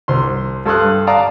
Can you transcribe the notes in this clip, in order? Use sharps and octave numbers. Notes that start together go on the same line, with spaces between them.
C2 C6
G2 A4 C6 D#6 F#6
D5 F5 A5 A#5 D#6